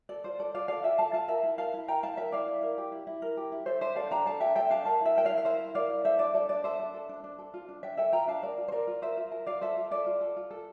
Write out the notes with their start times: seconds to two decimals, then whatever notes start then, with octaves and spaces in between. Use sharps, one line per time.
0.09 A4 D5
0.24 F4 C5
0.39 A4 D5
0.54 F4 D5 F5
0.68 A4 D5 F5
0.84 F4 E5 G5
0.98 A4 F5 A5
1.13 F4 F5 A5
1.28 A#4 E5 G5
1.43 E4
1.58 A#4 F5 A5
1.74 E4
1.88 A#4 G5 A#5
2.03 E4 F5 A5
2.17 A#4 E5 G5
2.32 E4 D5 F5
2.48 E4
2.62 A#4
2.78 G4
2.92 E4
3.07 E4
3.22 A#4
3.37 G4
3.52 E4
3.66 A4 C5 E5
3.81 D4 C5 E5
3.96 A4 D5 F5
4.11 D4 G5 A#5
4.26 A4 F5 A5
4.41 D4 E5 G5
4.56 A4 E5 G5
4.70 D4 F5 A5
4.85 A#4 F5 A5
5.01 E4 E5 G5
5.16 A#4 G5
5.25 D5 F5
5.30 E4
5.38 F5
5.45 A#4 C5 E5
5.60 E4
5.74 A#4 D5 F5
5.90 E4
6.05 A4 C5 E5
6.19 D4 D5
6.34 A4 D5
6.49 D4 D5
6.64 A4 C5 E5
6.79 D4
6.94 A4
7.09 D4
7.24 D4
7.39 A4
7.54 F4
7.69 D4
7.83 D4 E5 G5
7.97 A4 E5 G5
8.13 F4 G5 A#5
8.28 D4 F5 A5
8.42 A#4 D5
8.58 F4
8.68 C5
8.72 A#4 D5
8.87 F4
9.02 A#4 C5 E5
9.17 F4
9.32 A#4
9.46 F4 D5 F5
9.61 A4 C5 E5
9.77 F4
9.91 A4 D5
10.06 F4
10.21 A4
10.36 F4
10.51 A4